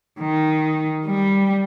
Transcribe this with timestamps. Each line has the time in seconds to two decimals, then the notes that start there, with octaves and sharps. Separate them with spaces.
0.20 D#3
1.06 G3